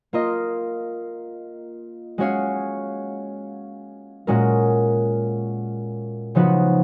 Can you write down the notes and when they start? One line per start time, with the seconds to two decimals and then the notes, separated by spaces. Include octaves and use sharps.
0.13 A#3 F4 A#4 D#5
2.18 G#3 C#4 F#4 C#5 F5
4.27 A#2 G#3 C#4 F#4 A#4
6.35 C#3 F3 B3 D#4 F#4